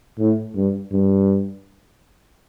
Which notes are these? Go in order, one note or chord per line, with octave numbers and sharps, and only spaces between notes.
A2
G2
G2